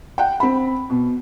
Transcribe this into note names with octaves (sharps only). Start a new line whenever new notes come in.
F#5 G5
C4 B5
B2